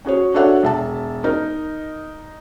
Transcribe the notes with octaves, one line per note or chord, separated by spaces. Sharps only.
C#4 F#4 G#4 C#5
D4 F#4 A4 C#5 E5 F#5
E1 E5 A5
D#4 A#4